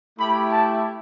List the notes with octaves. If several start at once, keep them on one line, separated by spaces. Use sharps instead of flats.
A3 E4 G4 B5
A5